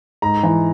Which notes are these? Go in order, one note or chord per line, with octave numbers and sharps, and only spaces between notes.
G#2 A#5
E3